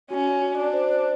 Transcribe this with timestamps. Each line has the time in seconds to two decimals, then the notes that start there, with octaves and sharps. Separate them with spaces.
0.11 C#4 F#4
0.42 F#4
0.58 D4
0.73 C5